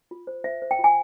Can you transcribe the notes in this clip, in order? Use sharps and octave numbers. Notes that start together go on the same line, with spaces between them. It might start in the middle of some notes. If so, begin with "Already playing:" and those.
F4
C5
C5 E5
C5
G5
F4
G#5